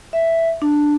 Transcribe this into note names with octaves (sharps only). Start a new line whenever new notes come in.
E5
D4